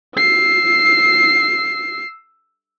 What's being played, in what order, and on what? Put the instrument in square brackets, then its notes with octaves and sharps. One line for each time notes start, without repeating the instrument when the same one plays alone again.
[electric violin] E6 C7